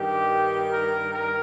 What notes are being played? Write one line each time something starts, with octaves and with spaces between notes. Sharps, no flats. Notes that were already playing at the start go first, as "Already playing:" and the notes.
Already playing: G2 D#3 G4
A#4
A#4